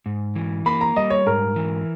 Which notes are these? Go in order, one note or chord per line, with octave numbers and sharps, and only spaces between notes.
G#2
E3
A#3 B5
A#5
G3 D#5
C#5
G#2 A#4
E3